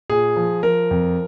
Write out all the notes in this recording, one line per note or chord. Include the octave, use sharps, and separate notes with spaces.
A#2 G#4
F3
F3 A#4
F2